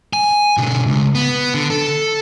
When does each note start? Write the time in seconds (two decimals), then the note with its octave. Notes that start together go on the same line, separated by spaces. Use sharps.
0.13 G#5
0.57 B2 D3
0.86 C#2
1.15 B3
1.54 D3
1.70 A4